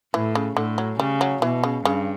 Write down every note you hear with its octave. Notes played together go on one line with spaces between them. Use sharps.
A2 E3
C#3
A2 D3
F#3
C#3 G3
F#3
B2 E3
C#3
G2 C#3